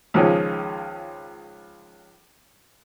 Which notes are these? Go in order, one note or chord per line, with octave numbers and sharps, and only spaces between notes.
C#2 D#3 F3 G#3 C#4